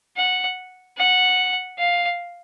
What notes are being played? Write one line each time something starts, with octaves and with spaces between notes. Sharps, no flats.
F#5
F#5
F5